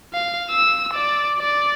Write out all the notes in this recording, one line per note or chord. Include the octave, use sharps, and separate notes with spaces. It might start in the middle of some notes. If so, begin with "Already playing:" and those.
F5
E6
D5
D5